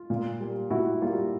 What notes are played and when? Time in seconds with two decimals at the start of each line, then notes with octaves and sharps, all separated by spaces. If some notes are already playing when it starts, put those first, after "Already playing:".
Already playing: F4
0.10 A#2
0.40 G3 A#3
0.70 A#2 E4 F#4
1.01 G3 A#3 F4